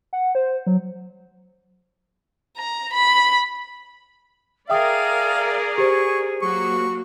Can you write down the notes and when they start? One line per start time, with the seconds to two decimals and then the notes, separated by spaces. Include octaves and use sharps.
0.13 F#5
0.35 C5
0.67 F#3
2.58 A#5
2.93 B5
4.70 G#4 A#4 D5 E5 F5 G5 D#6
5.78 G4 C5 C#6
6.42 F#3 A#3 F#4 C#6